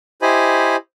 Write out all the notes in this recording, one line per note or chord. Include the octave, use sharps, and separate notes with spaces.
E4 G4 C5 D#5 G#5 B5